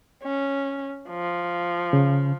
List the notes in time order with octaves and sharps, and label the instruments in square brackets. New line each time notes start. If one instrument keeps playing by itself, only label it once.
[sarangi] C#4
F3
[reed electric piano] C#3